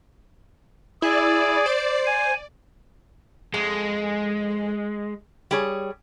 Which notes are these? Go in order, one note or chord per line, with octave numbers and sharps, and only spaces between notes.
E4 G#4 D5
C5
G#5
F2 G#3
G3 G#4 C#5